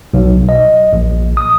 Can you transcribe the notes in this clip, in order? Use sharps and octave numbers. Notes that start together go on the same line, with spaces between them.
B1
D#5
A#1
D#6